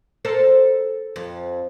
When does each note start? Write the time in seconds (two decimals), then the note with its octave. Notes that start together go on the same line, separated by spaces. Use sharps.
0.25 A4 A#4 C5
1.16 F2